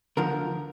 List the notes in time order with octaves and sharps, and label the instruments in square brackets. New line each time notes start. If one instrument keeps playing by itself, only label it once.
[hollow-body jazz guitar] D2 D3 F3 A#4